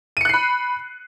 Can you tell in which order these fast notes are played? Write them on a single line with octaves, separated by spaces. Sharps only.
D#7 C#7 F#6 C7 B5